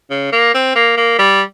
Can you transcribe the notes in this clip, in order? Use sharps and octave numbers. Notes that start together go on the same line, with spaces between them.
C#3
A#3
C4
A#3
A#3
G3